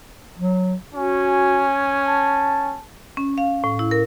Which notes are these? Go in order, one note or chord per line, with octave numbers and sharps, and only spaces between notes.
F#3
C#4 F#4 G#5
A5
C#4
F5
A2
E4
A#4